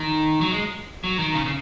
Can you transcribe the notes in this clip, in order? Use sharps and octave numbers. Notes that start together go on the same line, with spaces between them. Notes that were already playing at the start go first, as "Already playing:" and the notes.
Already playing: D#3
F#3
G#3
F#3
D#3
C#3
C#3